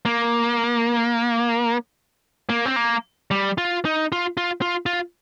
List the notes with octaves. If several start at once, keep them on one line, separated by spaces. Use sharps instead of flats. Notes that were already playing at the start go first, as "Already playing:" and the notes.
A#3
A#3
C4
A#3
G3
F4
D#4
F4
F4
F4
F4